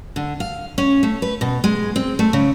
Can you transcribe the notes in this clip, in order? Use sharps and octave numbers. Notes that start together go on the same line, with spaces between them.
D3
F5
C#4
A3
B4
B2
G#3
C4
A3
C#3